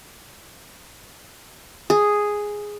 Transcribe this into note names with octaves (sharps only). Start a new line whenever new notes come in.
G#4